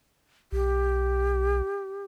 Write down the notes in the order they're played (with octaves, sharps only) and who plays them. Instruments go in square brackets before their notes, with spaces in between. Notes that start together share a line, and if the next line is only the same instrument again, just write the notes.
[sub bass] B1 [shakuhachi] G4